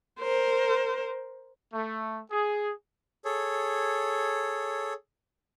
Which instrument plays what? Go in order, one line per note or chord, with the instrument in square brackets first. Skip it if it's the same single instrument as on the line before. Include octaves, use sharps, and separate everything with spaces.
[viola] A#4 C5
[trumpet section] A3
G#4
[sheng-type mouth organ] G#4 A4 C#5